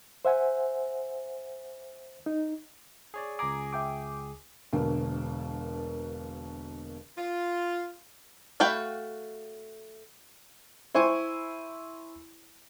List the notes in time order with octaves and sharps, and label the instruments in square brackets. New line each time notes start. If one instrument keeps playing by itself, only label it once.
[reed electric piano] C5 E5 F#5 G#5
D#4
[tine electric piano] G#4 C#5 D5
[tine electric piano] C#2 G#4 [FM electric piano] G#5 A#5 D6
[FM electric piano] E5 G5 D6
[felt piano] E1 B2 D3 A#3
[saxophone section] F4
[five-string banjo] A3 F#4 F5 G5 B5
[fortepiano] E4 C5 G#5 C#6